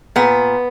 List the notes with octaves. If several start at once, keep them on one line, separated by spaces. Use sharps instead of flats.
A#2 B3